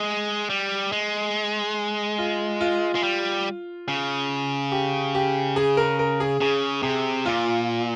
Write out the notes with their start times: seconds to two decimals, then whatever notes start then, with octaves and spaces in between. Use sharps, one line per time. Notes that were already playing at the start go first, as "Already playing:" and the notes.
Already playing: G#3
0.50 G3
0.92 G#3
2.18 F4
2.61 F4
2.95 G#3
3.03 G3
3.88 C#3
4.72 G4
5.15 G4
5.56 G#4
5.77 A#4
5.99 A#4
6.20 G#4
6.40 C#3 G#4
6.83 C3 G#4
7.26 A#2 F4